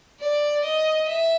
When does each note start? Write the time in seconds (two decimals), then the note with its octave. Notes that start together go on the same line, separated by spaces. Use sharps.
0.20 D5
0.64 D#5
1.07 E5